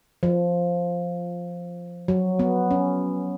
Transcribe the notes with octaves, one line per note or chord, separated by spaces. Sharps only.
F3
F#3
B3
C#4